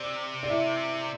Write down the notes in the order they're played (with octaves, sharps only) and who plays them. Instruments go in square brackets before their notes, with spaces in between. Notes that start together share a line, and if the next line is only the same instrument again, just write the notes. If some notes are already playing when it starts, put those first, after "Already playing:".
Already playing: [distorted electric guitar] C3 [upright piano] D5
[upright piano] D5
E4 E5